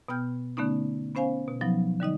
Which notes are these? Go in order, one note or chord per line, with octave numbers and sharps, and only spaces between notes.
B2 B3 G5 F6 G6
D3 A3 B3 C#4 D#4
B3 C#4 C5 F5 G#5
B2
F3 F#3 B3 D#4
D3 G3 D#4 D#5